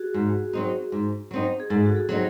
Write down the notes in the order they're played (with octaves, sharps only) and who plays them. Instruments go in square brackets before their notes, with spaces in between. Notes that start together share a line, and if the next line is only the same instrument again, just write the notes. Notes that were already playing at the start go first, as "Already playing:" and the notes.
Already playing: [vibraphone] F#4 G#4
[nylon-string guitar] G#2
F#3 C4 D#4
G#2
F#3 C4 D#4
[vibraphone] G#4
[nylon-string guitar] G#2 [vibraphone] A4
[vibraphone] F#4
G#4
[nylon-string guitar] F#3 C4 D#4